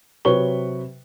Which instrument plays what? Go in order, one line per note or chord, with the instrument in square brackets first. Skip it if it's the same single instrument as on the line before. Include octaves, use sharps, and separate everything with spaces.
[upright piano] C3 F#3 B4 C#5 C#6 G7